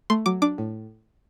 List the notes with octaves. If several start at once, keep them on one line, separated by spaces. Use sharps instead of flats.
A3 C6
F#3 D6
D4 D6
A2